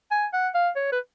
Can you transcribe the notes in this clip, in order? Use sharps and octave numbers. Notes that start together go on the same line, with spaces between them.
G#5
F#5
F5
C#5
B4